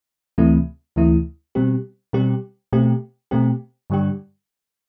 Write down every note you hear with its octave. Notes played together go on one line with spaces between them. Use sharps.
D2 C3 E3 A3 E4
D2 C3 E3 A3 E4
B2 G3 C4 G4
B2 G3 C4 G4
B2 A3 C4 G4
B2 A3 C4 G4
G2 D3 G3 D4 G4